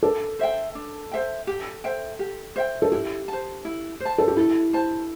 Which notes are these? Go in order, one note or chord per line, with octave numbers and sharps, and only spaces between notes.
D4 A4
C5 E5 G5
D4
C5 E5 G5
G4
C5 E5 G5
G4
C5 E5 G5
A4
E4 G4
C5 A5
E4
C5
A5
A4
G4
E4 A4
C5 A5